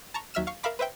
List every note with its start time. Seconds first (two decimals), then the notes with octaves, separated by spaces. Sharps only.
0.14 A5 A#5 C#6
0.34 D#2 F#3 E5 E6 F6 E7
0.47 F5 C#6
0.63 A#4 E5 F5 B5 D6
0.79 B4 C5 E5 G5